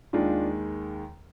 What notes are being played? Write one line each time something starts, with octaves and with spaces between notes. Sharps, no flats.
D#2 D#3 G#3 D4 F4